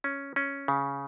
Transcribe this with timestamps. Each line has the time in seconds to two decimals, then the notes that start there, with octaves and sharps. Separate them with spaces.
0.04 C#4
0.36 C#4
0.68 C#3